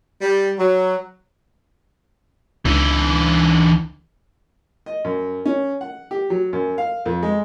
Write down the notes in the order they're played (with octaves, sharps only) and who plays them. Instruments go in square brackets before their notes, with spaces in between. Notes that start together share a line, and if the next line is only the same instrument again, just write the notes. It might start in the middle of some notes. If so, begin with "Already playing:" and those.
[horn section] G3
F#3
[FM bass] C#2 [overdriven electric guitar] D3 E3
[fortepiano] D#5
F#2
C#4
F#5
G4
F#3
F#2
F5
F2
G#3